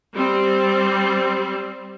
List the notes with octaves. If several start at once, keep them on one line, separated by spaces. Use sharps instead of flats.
G3 C4